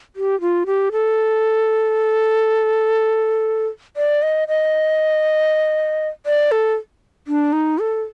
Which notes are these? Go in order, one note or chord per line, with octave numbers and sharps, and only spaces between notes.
G4
F4
G4
A4
D5
D#5
D#5
D5
A4
D4
D#4
A4